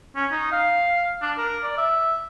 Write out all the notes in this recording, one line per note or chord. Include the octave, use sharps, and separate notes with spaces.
C#4
D#4
F5
D4
A#4
D5
E5